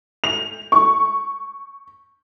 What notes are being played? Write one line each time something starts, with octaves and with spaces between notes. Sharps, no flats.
F7
C#6